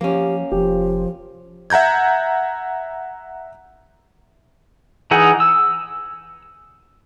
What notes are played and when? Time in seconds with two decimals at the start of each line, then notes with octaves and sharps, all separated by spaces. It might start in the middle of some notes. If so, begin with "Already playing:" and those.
0.01 F3 A#3 C#4 G4
0.52 F1 F3 G4
1.70 E5 F#5 A#5 G6 G#6
5.11 E3 D#4 G#4 F#5
5.40 E6